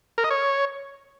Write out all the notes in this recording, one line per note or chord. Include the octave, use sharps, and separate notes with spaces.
A#4
D#5
C#5